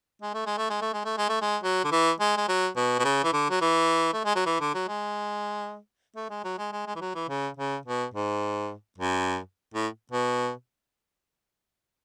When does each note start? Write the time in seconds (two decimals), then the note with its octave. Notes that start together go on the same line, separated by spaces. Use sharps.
0.22 G#3
0.34 A3
0.46 G#3
0.58 A3
0.70 G#3
0.81 A3
0.93 G#3
1.05 A3
1.17 G#3
1.29 A3
1.41 G#3
1.63 F#3
1.84 D3
1.91 E3
2.20 G#3
2.37 G#3
2.48 F#3
2.76 B2
2.99 B2
3.05 C#3
3.24 E3
3.33 D3
3.50 F#3
3.61 E3
4.13 A3
4.25 G#3
4.35 F#3
4.46 E3
4.61 D3
4.74 F#3
4.88 G#3
6.16 A3
6.30 G#3
6.44 F#3
6.58 G#3
6.72 G#3
6.87 G#3
6.96 E3
7.01 F#3
7.15 E3
7.29 C#3
7.57 C#3
7.85 B2
8.14 G#2
8.98 F#2
9.74 A2
10.11 B2